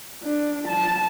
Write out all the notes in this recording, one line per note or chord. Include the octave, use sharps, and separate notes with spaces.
D4
A5